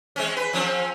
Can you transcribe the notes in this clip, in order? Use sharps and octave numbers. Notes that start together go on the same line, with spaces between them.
G#3 C4 C#4
B4
F3 C4 C#4